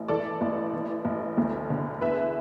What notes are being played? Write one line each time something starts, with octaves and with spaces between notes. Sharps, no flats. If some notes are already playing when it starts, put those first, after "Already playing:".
Already playing: A1
E3 A4 D5
A1
E3
A1
D2
D3
E2 B4 E5